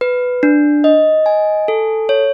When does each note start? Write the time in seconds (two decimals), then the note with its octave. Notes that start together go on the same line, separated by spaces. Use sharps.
0.01 B4
0.43 D4
0.84 D#5
1.26 G#5
1.68 A4
2.09 C#5